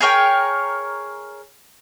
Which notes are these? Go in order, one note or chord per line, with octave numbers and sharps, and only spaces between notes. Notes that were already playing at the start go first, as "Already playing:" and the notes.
G#4 A#4 C#5 G5